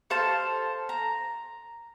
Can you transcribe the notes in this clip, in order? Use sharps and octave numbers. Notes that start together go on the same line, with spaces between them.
A4 C5 F5 A5
A#5